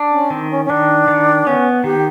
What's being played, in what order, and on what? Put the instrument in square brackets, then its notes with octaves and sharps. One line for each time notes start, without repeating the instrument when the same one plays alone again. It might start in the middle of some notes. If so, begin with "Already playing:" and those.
Already playing: [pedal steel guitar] D4
[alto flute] C#4
[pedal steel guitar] D#3 [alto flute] C4
[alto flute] C#4
C#4
[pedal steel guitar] D#3 [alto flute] D4
[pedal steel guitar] D#3
[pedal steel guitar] B3 [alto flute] C#4
[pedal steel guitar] D#3 [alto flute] G4